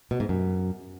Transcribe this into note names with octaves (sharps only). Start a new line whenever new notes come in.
B2
G#2
F#2